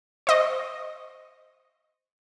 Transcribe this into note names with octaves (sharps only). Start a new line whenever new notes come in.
C5 D#5 C#6